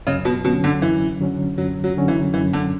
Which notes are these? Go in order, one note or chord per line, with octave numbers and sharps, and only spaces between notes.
F#2 C#3
B2
B2 D3 F#3 C#4
D3
F#2 E3
D3 F#3 C#4
F#2 F#3
F#3
D3 F#3 C#4
E3
F#2 E3
D3